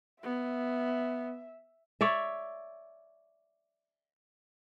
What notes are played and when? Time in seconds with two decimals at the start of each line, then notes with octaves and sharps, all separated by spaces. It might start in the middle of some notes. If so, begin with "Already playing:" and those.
0.24 B3 E5
2.01 C#5 D5 E5